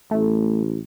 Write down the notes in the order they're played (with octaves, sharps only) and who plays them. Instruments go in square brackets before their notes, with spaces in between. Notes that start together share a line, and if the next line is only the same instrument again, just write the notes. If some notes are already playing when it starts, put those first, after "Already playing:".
[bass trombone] A1 [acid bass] A3